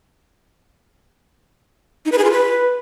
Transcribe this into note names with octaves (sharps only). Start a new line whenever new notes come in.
D#4
B4
G#4
F4
B4